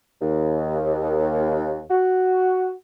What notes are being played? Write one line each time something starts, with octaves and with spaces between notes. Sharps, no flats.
D#2
F#4